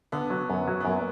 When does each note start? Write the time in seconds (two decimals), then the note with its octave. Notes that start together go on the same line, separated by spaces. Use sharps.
0.12 D3 B3
0.30 F#3
0.50 F#2 B3
0.68 F#3
0.80 B3
0.85 F#2 A#3